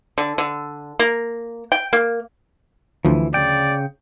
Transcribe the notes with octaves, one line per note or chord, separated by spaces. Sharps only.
D3
D3
A#3
G5
A#3
D2 E3 F3
C#3 D5 G5